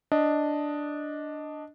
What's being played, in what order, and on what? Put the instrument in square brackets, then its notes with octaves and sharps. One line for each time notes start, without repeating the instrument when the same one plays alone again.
[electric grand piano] D4 D#5